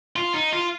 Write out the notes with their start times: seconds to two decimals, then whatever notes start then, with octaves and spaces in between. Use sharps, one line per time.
0.16 F4
0.34 D#4
0.52 F4